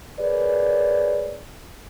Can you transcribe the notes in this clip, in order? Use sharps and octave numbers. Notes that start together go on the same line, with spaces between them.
G#4 A#4 B4 C#5 D5